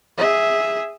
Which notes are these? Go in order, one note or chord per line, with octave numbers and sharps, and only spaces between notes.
G#4 E5